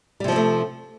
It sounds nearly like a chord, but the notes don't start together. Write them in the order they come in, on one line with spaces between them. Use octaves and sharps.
G3 C3 F3 C4 A3